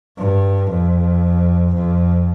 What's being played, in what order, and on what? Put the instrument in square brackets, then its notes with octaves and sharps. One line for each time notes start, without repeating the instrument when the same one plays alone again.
[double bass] G2
F2
F2